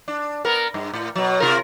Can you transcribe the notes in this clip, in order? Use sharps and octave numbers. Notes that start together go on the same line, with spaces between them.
D4
B3 A#4
G2
A2
B2 F#3
C3 F4 A#4